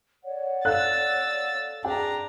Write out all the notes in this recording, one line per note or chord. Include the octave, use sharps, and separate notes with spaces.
C#5 D5 F#5
A4 F5 E6 F#6 A6
D4 G#4 G5 A#5